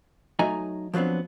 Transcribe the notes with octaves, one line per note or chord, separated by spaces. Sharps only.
F#3 A3 D#4 D#5 G#5 A#5
F3 F#3 B3 C4 D4